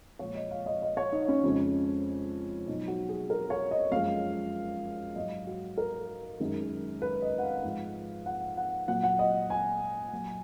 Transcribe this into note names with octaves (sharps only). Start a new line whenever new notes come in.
A#2 F3 G#3 C#5
D#5
F5
D#5
D#5
C#5
D#4
C#4
F2 C#3 G#3
B2 F#3 D#4
F#4
G#4
A#4
C#5
D#5
F#2 F3 G#3 F5
G#2 F#3 D#5
F#4
A#4
F#2 D#3 G#3
B4
D#5
F#5
F5
G#2 F3 G#3
F#5
F#5
A#2 F#3 F#5
F#5
D#5
G#5
A#2 F#3